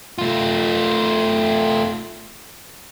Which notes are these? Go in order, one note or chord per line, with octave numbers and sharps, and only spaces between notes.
A3 F4